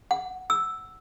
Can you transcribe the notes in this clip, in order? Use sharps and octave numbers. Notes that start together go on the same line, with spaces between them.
F#5
E6